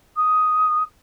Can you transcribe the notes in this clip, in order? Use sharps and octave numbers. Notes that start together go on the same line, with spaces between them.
D#6